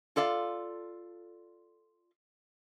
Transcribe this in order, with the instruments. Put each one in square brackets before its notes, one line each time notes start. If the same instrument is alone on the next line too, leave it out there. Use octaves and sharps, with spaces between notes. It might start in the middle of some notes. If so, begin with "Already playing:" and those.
[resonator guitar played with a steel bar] F4 A4 D5 F5